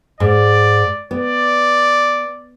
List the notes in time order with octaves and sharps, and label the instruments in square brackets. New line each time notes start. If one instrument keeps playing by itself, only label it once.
[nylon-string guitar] G#2 [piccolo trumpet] D5
[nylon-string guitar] B3 [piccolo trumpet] D5